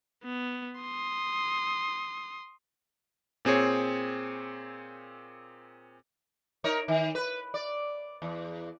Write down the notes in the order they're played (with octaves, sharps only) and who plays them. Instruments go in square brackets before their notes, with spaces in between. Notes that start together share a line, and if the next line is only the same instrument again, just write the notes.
[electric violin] B3
C6 D#6
[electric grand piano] A#2 C4 G#4 C#5
[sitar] D#4 A#4 C#5
D#3
B4
D5
E2